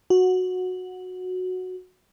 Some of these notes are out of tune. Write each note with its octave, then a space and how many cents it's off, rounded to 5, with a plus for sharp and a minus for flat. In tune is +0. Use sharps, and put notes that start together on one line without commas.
F#4 -10